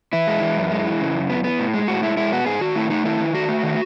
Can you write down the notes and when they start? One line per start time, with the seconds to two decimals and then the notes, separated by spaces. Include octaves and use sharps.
0.13 E3 E4
0.28 G#3
0.42 E3
0.57 F#2
0.71 G#3
0.86 E3
1.00 C#3
1.15 F#2
1.30 B3
1.44 B3
1.59 A2
1.74 G#3
1.88 A2 F#4
2.03 G#3 E4
2.17 G#3 E4
2.32 B3 F#4
2.46 G#2 G#4
2.61 D#3 F#4
2.75 A3 E4
2.90 A3 D#4
3.05 D#3 E4
3.20 D#3
3.34 A3 F#4
3.49 A3
3.63 D#3